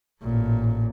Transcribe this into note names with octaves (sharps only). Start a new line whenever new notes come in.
A1 A#2